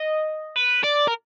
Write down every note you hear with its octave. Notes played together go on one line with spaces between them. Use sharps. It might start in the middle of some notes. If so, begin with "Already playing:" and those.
Already playing: D#5
B4
D5
A#4